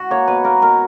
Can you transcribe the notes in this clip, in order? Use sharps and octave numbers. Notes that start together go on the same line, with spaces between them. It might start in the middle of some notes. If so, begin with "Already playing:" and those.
Already playing: F#4
A#3 C#5
B2 B4
A#3 A#4
B2 A#4